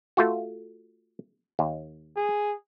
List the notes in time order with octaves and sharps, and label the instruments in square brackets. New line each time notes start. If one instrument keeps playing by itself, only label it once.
[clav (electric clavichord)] A3 F4 F#4
D#2
[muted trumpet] G#4